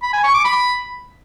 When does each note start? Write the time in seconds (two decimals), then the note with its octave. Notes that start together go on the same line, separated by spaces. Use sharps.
0.03 B5
0.13 G#5
0.23 C#6
0.34 D6
0.44 B5